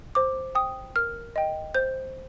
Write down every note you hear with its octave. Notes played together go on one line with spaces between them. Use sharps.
C5 D6
G5 D#6
A#4 F6
D#5 G5
C5 G6